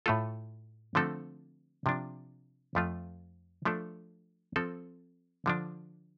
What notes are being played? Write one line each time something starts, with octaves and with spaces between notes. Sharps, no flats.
A2 A3 F4 A4
D3 F3 A3 C4 A4
C3 F3 D4
F2 F3 A3 F4
F3 A3 D4 A4
F3 C4 A4
D3 F3 D4